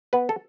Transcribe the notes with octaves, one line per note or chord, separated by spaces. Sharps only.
B3 B4
A4